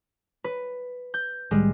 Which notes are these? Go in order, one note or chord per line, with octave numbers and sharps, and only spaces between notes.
B4
G6
C2 A2 D#3 G3 G#3